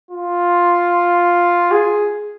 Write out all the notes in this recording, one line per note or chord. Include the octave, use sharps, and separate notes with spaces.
F4
G#4